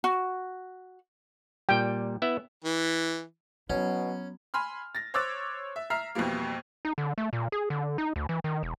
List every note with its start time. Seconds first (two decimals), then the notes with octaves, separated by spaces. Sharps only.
0.04 F#4
1.69 A#2 G3 G5
2.22 B3 E4 E5
2.64 E3
3.70 B2 F#3 B3 C#4 E4
4.54 G#5 B5 C6 F6
4.95 A6 A#6
5.14 C5 C#5 D6 E6 F#6 A6
5.76 E5
5.90 E5 A#5 F6 C7
6.15 F2 B2 E3 G3 A#3
6.85 D#4
6.98 D3
7.18 A3
7.33 A#2
7.52 G#4
7.70 D3
7.98 D#4
8.16 D2
8.29 E3
8.44 D#3
8.63 E1